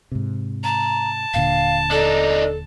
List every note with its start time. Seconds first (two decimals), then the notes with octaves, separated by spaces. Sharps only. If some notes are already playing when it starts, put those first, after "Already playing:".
0.12 G#2 C3
0.64 A5 A#5
1.34 D#1 A#2 D3 F5
1.91 D4 D#4 A4